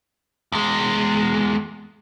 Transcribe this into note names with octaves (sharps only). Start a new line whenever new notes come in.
E2 G#3